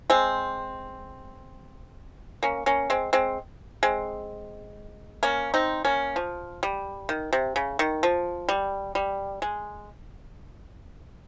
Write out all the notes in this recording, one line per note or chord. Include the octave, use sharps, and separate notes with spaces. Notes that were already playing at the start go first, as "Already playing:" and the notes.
G#3 C4
A#3 C#4
A#3 C#4
G#3 C4
G#3 C4
G#3 C4
A#3 C#4
C4 D#4
A#3 C#4
F3
G3
D#3
C3
C#3
D#3
F3
G3
G3
G#3